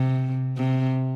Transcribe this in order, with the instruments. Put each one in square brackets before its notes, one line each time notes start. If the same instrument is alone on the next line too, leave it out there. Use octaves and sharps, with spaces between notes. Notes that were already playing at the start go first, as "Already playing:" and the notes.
Already playing: [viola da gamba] C3
C3